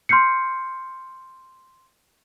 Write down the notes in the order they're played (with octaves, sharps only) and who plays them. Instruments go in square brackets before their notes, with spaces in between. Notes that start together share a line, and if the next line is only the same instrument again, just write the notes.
[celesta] C6 F6 G6 C7 C#7